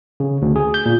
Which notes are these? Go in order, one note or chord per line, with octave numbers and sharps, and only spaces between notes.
C#3
D2
G#4
G6
A#2